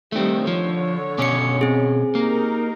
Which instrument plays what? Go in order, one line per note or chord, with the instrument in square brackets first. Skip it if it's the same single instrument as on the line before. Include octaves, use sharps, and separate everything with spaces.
[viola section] D3 D#3 G3 [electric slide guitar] A3 C4
[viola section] D3 C#5 [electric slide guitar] F3
[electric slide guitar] B2 C#4 [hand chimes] D6 C#7
[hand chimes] C4 G#4
[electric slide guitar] A#3 [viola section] D#4 G4 A#4